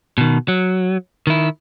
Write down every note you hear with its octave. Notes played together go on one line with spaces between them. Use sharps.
B2 D#3
F#3
D#3 E4